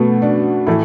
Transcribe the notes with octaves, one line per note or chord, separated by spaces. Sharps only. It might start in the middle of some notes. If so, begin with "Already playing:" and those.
Already playing: B2 A3 B3
D4
A2 E3 A3 E4